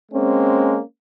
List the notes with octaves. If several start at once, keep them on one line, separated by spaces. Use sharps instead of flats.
G#3 A#3 C4 C#4